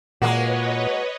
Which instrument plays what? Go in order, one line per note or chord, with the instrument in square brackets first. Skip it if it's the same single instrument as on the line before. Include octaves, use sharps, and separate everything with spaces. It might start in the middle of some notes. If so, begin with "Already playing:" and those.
[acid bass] A#2 [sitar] G#3 A#3 F#4 [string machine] B4 C#5 D#5